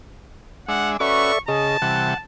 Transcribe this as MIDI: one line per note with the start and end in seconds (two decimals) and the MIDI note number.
0.68 0.97 56
0.68 0.97 62
0.68 0.97 76
0.68 0.93 78
1.00 1.32 61
1.00 1.32 66
1.00 1.39 69
1.00 1.32 71
1.00 1.39 74
1.00 1.39 76
1.00 1.40 85
1.48 1.77 49
1.48 1.77 68
1.48 1.77 75
1.48 2.23 81
1.82 2.14 48
1.82 2.14 52
1.82 2.14 55
1.82 2.17 78